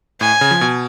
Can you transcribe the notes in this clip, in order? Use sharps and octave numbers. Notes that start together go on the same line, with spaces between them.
A2 G#5
C#3
F3
B2